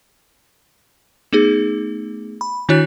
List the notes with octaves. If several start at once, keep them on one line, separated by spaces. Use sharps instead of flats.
A3 B3 D#4 G#4
B5
D#3 D4 E4 F#4 C#5 F#6